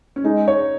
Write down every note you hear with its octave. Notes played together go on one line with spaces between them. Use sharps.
C#4
G#3 D#4
C#5